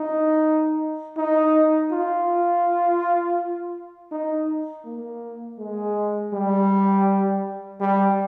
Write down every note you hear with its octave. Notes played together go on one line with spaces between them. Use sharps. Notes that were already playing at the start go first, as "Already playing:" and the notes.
Already playing: D#4
D#4
F4
D#4
A#3
G#3
G3
G3